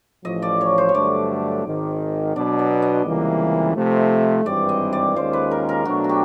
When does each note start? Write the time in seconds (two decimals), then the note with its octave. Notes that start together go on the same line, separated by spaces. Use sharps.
0.25 A1 A2 F3 D#5
0.42 D5
0.61 C#5
0.78 C5
0.89 C#5
0.95 G2 D3 F#3 A3 D4 D5
1.65 G#1 G#2 D#3
2.35 B2 F#3 B3 D4 D5
2.59 D5
2.82 D#5
3.06 C#2 C3 E3 G3 A#3
3.76 C3 F3 A3
4.46 G#1 G2 E3 G3 C4 D5
4.69 D#5
4.93 D5
5.16 D#2 D#3 G#3 C#4 F4 C5
5.33 B4
5.51 A#4
5.69 A#4
5.85 B2 F#3 A3 D4 F#4
6.04 F#4
6.09 G4